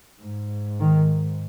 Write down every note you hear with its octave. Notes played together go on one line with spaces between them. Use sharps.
G#2
D#3